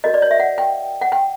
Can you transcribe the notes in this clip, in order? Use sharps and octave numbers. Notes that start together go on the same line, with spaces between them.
F#4 A#4 C#5 D#5
D5
C#5
E5
F#5
G5
F#5
G5